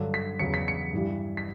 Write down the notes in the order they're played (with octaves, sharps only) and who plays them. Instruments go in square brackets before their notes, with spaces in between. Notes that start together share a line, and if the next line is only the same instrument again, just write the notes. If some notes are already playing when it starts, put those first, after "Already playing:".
Already playing: [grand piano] G2 D3 F#3
B6
E2 C#3 F#3 C#7
B6
C#7
G2 E3 G3
B6